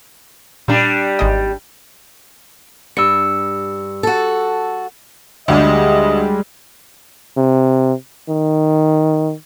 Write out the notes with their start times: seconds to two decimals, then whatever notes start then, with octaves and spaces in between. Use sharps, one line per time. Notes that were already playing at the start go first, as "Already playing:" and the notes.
0.68 A#2 G3 D4
1.19 G#1 G#3 D#5
2.97 G2 E6 C#7
4.03 F#4 A4
5.48 D2 G3 G#3 D#5
7.37 C3
8.29 D#3